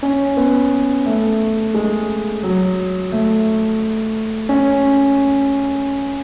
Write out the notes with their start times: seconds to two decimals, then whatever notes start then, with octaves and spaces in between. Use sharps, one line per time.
0.03 C#4
0.37 B3
1.06 A3
1.74 G#3
2.43 F#3
3.12 A3
4.49 C#4